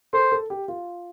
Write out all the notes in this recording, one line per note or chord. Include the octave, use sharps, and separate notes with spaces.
A4 C5
A4
G4
F4